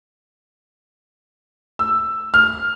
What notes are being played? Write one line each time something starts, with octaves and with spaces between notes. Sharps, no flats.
E6
F6